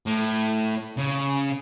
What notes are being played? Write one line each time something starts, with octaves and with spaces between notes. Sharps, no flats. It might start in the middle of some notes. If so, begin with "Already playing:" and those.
A2
C#3